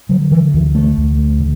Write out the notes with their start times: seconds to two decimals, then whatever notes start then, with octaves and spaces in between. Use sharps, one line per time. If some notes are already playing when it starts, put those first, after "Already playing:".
0.09 D3 F#3
0.31 E3
0.54 D2 E3
0.75 A3
0.97 D2
1.40 D3